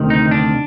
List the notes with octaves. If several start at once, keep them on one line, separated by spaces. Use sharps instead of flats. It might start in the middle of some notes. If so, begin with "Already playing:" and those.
Already playing: D2 C3 D#3
D#4
D4